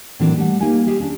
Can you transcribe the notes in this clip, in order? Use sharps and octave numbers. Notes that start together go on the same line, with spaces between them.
A2 E3 F#3 A#3 C4 D4
G3 A3 F#5
A#3 D#4 G4 G#5
G4 G#4 C5 F5
C#4 D4